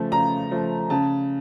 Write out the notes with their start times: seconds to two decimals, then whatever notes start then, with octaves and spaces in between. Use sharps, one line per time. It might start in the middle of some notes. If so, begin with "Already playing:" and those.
Already playing: C#3 F3 A3
0.12 C#3 A#5
0.51 F3 A3
0.90 C#3 A5